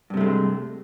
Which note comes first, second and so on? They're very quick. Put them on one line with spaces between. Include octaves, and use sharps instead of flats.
G2 C3 A3 G#3